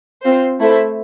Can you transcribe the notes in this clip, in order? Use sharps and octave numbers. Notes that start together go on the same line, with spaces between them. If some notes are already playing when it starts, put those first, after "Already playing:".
C4 F4 C5
A3 E4 A4 C5 E5